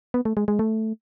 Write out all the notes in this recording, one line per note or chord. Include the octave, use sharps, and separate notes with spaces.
B3
A3
G#3
G#3
A3